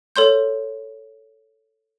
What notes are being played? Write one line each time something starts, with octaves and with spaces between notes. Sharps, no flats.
A4 C#5 C6 G6